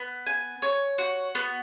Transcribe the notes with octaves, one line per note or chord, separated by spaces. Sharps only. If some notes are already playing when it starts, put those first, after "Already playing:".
Already playing: B3
G#5
C#5
F#4
B3